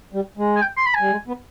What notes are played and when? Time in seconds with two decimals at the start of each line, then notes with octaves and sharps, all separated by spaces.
0.13 G3
0.38 G#3
0.56 G#5
0.62 G5
0.77 C6
0.86 B5
0.94 G#5
1.00 G3
1.11 G#3
1.28 B3